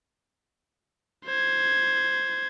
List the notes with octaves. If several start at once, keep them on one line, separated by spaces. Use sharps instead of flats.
C5 G#6